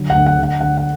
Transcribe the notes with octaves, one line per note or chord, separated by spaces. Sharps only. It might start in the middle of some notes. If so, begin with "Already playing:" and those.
Already playing: D3 F#3
F#5
D2
F#5
D3 F#5
D3 F#5
F#5